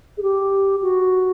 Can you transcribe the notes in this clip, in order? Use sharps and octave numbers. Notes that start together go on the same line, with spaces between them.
G#4
G4
F#4